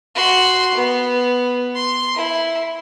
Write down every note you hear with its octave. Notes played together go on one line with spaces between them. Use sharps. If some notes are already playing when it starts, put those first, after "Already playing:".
F#4 C6
B3
C6
E4